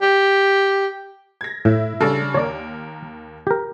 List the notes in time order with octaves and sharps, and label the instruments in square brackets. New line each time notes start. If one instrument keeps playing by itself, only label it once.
[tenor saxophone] G4
[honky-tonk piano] G#6 A#6
[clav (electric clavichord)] A2 [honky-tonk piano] E4
[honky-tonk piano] C#3 G3 D4 [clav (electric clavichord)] A4 A5
[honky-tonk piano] D#2 A#4 [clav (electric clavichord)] C#5 D5
[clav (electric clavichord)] G4 A#4